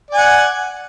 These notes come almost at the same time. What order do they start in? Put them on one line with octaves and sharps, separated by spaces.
D5 G#5 F#5